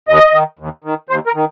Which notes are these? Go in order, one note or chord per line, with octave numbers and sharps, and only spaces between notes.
D#2 D#5
D#3
D#2
D#3
D#2 C5
A#4
D#3